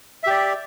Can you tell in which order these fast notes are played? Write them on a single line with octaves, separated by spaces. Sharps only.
E5 G4 D5